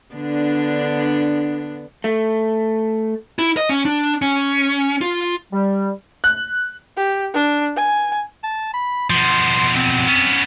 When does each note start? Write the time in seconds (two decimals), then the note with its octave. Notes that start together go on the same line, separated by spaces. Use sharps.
0.14 D3 B3 D4
2.04 A3
3.39 E4
3.57 D#5
3.69 C#4
3.85 D4
4.22 C#4
5.01 F4
5.52 G3
6.24 F#6
6.97 G4
7.34 D4
7.77 G#5
8.44 A5
8.74 B5
9.10 B2 F3 C6
9.75 C4
10.07 B3 C#4